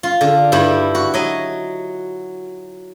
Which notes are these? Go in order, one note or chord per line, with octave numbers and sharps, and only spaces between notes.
F4
D3
G2 G3 E4
F#4
F#3 D#5